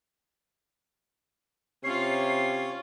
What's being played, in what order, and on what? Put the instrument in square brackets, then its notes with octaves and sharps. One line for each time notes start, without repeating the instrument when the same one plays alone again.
[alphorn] C3 [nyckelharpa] C#4 F4 [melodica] C#5 [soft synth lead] C7